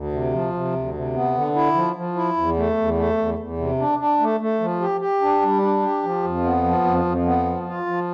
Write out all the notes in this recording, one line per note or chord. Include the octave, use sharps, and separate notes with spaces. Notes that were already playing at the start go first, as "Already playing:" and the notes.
Already playing: D2
C3
F3
C3
D2
C3
B3
D3
E4
F3
F3
E4
E2
A3
E2
A3
E2
E2
C3
D4
D4
A3
A3
F3
G4
G4
D4
G3
D4
G4
F3
F2
B3
F3
F2
F2
B3
F3
F4
F3